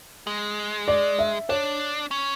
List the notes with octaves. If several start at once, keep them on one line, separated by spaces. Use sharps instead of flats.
G#3
D5
E5
D4 C#5
C#4